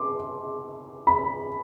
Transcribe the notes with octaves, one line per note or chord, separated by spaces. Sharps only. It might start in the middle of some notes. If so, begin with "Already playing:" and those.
Already playing: C6 D6
B5